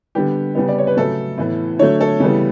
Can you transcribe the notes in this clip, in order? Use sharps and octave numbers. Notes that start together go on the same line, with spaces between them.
D3 G3 B3 G4
C#3 G3 B3
D5
C#5
B4
C#3 F#3 A3 A4
A2 E3 B3
D3 F#3 A3 C#5
A4
C#3 E3 G3 B3